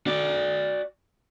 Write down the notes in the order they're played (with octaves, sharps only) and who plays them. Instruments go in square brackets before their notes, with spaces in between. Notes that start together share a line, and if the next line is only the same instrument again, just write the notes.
[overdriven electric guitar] F#4 D5